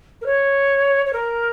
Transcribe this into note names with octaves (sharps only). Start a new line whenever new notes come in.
A#4
C#5
C#5
A#4